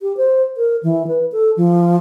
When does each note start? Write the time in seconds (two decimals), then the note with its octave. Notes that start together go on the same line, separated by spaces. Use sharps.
0.01 G4
0.17 C5
0.57 A#4
0.83 E3
1.08 B4
1.32 A4
1.57 F3